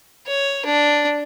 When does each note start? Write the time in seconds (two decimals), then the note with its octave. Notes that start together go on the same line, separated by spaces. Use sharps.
0.27 C#5
0.65 D4